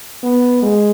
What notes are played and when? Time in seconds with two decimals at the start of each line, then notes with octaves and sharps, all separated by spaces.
0.23 B3
0.62 G#3